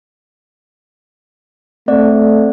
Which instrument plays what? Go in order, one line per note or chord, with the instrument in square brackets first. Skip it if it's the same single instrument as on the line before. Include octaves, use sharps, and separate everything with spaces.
[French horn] A3 [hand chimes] C4 D5